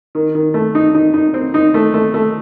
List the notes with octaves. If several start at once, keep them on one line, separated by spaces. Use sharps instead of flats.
D#3
D#3
A3
D#4
D#4
D#4
C4
D#4
A3
A3
A3